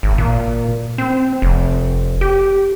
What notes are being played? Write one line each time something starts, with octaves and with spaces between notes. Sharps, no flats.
G#1
A#2
C4
F1
G4